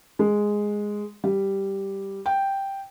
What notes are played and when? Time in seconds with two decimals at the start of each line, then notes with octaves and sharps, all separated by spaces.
0.19 G#3
1.24 G3
2.26 G5